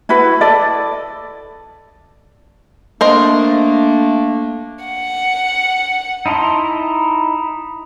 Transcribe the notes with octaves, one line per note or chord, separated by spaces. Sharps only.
E4 F#4 B4
A4 D5 D#5
A3 A#3 D4 A#4 C5 D#5
F#5
D#4 E4 A5 A#5 C6